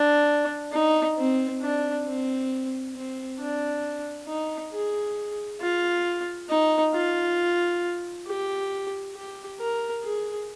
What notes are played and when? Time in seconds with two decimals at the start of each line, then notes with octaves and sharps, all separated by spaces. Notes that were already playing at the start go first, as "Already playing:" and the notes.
Already playing: D4
0.72 D#4
1.17 C4
1.62 D4
2.05 C4
2.95 C4
3.39 D4
4.27 D#4
4.72 G#4
5.61 F4
6.49 D#4
6.94 F4
8.27 G4
9.16 G4
9.60 A#4
10.03 G#4